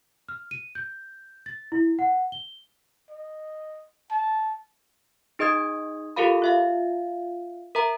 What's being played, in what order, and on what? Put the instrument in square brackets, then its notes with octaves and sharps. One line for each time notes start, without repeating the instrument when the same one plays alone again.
[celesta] F6
D#7
G6
A6
E4
F#5
G7
[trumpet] D#5
A5
[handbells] D#4 G#4 D#5 D#6 G#6
F4 G4 A4 A#4 F5 B5
F4 E5 F5
A#4 E5 A#5